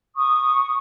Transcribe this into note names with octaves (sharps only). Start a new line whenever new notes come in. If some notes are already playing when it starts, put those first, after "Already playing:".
C#6 D#6